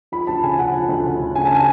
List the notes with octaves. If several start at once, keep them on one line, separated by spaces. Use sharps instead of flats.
F3 B5
D2 A5
C#3 G#5
C#3 F#5
F3
D2
C#3
C#3
C#3 G#5
A5
G#5